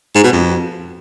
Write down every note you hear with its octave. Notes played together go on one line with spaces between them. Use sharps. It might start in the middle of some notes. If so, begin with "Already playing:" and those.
G#2
B2
F2